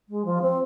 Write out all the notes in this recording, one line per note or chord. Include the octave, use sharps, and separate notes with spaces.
G#3
F3
C4